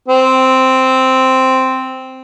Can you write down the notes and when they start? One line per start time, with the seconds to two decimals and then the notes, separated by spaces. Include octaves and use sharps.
0.08 C4